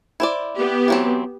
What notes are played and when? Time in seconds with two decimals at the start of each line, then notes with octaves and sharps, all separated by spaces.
0.20 E4 C5 D5
0.56 B3 G4
0.88 E3 F#3 C4